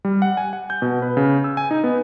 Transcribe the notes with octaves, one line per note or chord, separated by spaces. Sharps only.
G3
F#5
G#5
F#5
G6
B2
B4
C#3
E6
G#5
D#4
B3